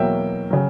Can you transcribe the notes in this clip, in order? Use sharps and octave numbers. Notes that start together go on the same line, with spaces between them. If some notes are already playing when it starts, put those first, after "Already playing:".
Already playing: E2 B2 F#3 A#3 E5 G5
C#3 F#3